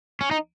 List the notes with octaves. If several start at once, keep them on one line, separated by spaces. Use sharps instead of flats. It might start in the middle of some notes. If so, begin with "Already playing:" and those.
C#4
D#4